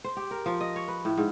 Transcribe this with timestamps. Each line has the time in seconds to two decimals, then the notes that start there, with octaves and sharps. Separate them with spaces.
0.04 C5
0.17 G4
0.31 A#4
0.46 F3
0.61 D#5
0.76 C#5
0.88 B4
1.05 A2
1.18 G#2